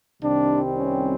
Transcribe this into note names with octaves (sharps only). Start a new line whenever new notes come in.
C2 C3 D#3 G3 C4 D4
C#4